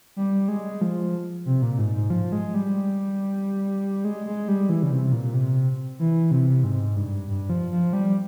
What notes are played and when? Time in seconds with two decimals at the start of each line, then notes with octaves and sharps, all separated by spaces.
0.16 G3
0.48 G#3
0.81 F3
1.46 C3
1.62 A#2
1.78 G#2
1.94 G#2
2.10 F3
2.32 G#3
2.54 G3
4.05 G#3
4.26 G#3
4.48 G3
4.69 E3
4.83 C#3
4.91 C3
5.12 A#2
5.34 C3
5.99 E3
6.31 C3
6.64 G#2
6.96 G2
7.28 G2
7.50 F3
7.72 F3
7.93 G3